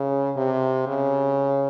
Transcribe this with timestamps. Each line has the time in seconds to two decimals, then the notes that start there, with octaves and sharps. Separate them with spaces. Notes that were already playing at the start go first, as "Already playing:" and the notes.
Already playing: C#3
0.36 C3
0.87 C#3